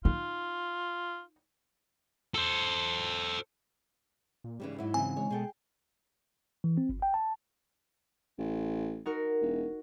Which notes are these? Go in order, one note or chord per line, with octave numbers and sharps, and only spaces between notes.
D#4 F4
A4 C5
A#2
G#2 C#3 E3 G3
G#2 F#3 E4
C#3 E3 C4 G#5
G#3 C#5
B2 G#4 A4 G5
E3
C4
G1
G5
A5
A1
D#4 F#4 A#4
E1